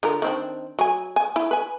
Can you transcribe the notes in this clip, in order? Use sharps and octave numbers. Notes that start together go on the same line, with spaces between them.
D3 F4 A#4
D#3 C4 D4
F#3 G#5
G#5
E4
B4 G#5